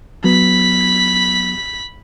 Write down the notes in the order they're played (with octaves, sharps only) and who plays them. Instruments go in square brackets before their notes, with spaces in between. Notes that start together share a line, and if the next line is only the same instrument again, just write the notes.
[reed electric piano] F#3 B3 [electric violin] B5 B6